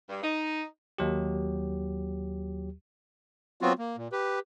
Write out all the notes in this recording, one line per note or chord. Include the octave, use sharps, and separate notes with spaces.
G2
D#4
D#2 F#3 G4
F#3 B3 C4 F4 F#4
A#3
A#2
G4 B4